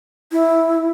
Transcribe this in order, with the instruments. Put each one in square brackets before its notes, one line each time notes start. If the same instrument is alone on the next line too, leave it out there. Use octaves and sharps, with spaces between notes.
[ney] E4